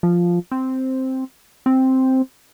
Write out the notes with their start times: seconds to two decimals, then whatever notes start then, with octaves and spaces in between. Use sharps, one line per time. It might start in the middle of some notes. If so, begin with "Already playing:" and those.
0.03 F3
0.52 C4
1.66 C4